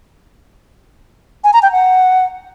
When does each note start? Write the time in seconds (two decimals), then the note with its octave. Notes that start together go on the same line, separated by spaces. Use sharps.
1.44 G#5
1.53 A#5
1.63 G5
1.72 F#5